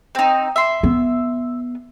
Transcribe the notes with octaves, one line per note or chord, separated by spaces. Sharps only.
C4 D#4
E5 C6
B3